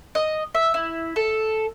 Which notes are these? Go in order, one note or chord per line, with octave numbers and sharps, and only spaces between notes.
D#5
E5
E4
A4